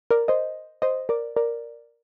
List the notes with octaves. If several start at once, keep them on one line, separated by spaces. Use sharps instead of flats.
A#4 D5
C5 D#5
C5 D#5
A#4 D5
A#4 D5